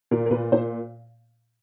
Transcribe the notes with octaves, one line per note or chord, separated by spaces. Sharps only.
A#2 A#4
A#4
A#2 B4
A#2 C5